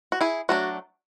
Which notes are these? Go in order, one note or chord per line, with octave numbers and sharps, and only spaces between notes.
F#4
E4 G#4
F#3 A3 D4 F#4